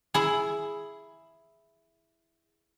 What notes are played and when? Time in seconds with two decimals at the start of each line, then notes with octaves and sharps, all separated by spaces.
0.14 E4 G#4